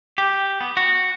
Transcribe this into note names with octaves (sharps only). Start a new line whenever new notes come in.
G4
B3
F#4